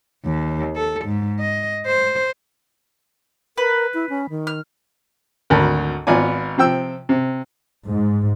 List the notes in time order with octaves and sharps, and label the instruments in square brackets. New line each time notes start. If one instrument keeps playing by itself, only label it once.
[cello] D#2
A4
G#2
D#5
C5
[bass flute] A#4 [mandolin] B4
[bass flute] E4
C#4
D#3
[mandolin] F6
[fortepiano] G#1 D2 A#4 A5 B5
G#1 B3 F4 D5 G#5
C3 F3 G5 E6
C3
[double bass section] G#2